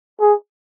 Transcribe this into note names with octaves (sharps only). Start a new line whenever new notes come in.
G#4